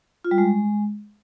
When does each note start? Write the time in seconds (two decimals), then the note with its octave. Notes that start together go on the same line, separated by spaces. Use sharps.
0.24 F4
0.31 G3
0.38 G#3